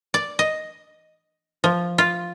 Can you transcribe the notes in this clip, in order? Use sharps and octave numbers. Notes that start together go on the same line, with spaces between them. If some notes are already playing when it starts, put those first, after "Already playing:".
D5
D#5
F3
F4